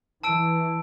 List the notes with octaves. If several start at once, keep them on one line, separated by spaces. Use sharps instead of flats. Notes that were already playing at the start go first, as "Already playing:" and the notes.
E3 A5 E6 D7